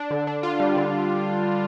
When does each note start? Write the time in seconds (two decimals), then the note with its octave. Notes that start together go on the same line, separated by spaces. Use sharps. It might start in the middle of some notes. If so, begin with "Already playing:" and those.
Already playing: D4
0.11 D3
0.27 D4
0.43 F4
0.60 G3
0.77 D3